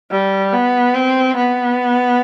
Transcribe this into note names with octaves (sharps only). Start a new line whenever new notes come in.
G3
B3
C4
B3